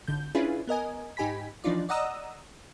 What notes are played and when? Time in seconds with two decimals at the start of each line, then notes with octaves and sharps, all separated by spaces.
0.08 G#1 D3 G6
0.35 C#4 D4 E4 F4 G#4 B4
0.67 B3 A#4 D#5 G#5
1.17 G#2 D#4 G4 G#5 B5 B6
1.64 E3 F3 D4 D#4 F4 D5
1.89 D5 D#5 F#5 A#5 D#6 E6